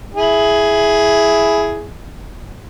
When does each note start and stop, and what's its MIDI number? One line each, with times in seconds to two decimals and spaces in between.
0.14 1.87 64
0.14 1.87 68